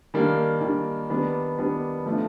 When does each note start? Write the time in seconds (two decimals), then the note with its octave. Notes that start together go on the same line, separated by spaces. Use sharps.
0.14 D#3 G3 A#3 D4
0.61 D#3 G3 A#3 D4
1.10 D#3 G3 B3 D4
1.58 D#3 G3 B3 D4
2.06 F3 A3 D4